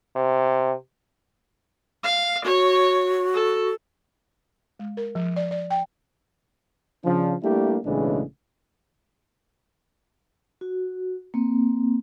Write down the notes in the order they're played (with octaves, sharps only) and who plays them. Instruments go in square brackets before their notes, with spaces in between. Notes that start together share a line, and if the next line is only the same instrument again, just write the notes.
[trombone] C3
[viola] F5
[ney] F#4 [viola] C#5
[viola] A4
[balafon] G#3
A#4
F3
D5
D5
G5
[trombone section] C#3 F3 D4
G3 A3 A#3 D4 E4 G4
B1 A2 C#3 E3 G#3 D4
[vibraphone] F#4
A#3 C4